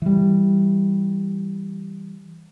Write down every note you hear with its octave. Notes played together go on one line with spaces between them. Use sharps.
E3 G3